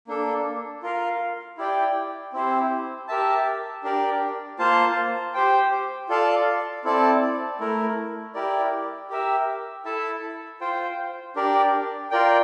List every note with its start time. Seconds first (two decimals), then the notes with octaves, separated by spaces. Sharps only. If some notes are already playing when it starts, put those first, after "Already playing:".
0.07 A#3 D4 A4
0.83 F4 A#4 F5
1.57 E4 G4 D5 G5
2.33 C4 E4 G4 C5
3.08 G4 A#4 E5 A5
3.83 D4 G4 A#4 D5
4.59 A#3 F4 C5 F5 A5
5.34 G4 C5 G5
6.09 F4 A4 D5 F5 A5
6.84 C4 E4 A4 D5 A5
7.60 A3 E4 A#4
8.34 E4 G4 A#4 D5
9.10 G4 A#4 E5
9.85 E4 A4 E5 A5
10.61 F4 C5 G5
11.36 D4 G4 A#4 D5
12.11 F4 A#4 D5 G5